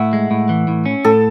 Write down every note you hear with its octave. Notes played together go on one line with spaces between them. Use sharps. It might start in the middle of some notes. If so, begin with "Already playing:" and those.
Already playing: A2 E5 F#5
G#3
A2
E3
A2
C#4
A2 A4